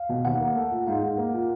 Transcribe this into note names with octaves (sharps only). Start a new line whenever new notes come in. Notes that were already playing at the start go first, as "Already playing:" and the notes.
Already playing: F5
B2
D#2 F#5
A#3
A3
A#2
G#2 F5
G#2
A#3
A#2